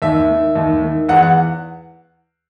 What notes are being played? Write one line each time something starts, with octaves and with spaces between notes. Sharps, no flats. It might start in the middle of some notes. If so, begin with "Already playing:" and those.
D#2 E5
D#3
D#2
D#3
E2 F#5
F#5